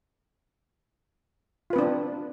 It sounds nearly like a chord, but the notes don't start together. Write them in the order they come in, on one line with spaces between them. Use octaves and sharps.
F4 B4 C4 D4